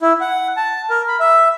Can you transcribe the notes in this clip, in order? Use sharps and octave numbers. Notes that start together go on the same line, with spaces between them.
E4
F#5
A5
A#4
B5
E5